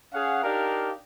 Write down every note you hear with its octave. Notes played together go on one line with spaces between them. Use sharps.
C#4 G#4 F5 F#5
D4 D#4 G4 A#4 F5